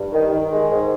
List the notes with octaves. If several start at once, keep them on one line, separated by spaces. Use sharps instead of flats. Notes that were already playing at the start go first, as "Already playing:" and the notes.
Already playing: G2
D#3
D#3
G#3
G#2